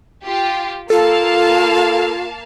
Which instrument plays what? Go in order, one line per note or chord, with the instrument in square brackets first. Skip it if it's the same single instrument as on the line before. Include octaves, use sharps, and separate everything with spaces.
[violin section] F4 G4
[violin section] A#3 F5 A5 [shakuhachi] F4 [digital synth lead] A4